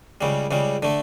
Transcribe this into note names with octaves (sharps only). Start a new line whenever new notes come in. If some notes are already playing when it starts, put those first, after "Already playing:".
C#2 C#3 G3
C#2 C#3 G3
D3 A3